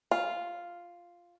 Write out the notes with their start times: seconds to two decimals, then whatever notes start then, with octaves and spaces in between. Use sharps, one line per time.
0.11 F4